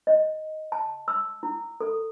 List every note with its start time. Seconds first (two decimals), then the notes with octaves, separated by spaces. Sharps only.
0.07 D#5
0.72 A5
1.08 E6
1.43 E4
1.80 A4